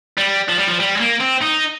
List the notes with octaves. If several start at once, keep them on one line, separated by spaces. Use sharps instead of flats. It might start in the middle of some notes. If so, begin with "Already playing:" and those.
G3
F3
G3
F3
G3
G#3
A#3
C4
D#4